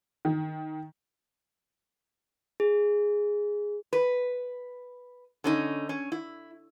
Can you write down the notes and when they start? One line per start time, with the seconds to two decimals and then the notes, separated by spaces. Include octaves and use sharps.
0.25 D#3
2.60 G#4
3.93 B4
5.44 D3 C#4 D#4
5.89 C#4
6.12 E4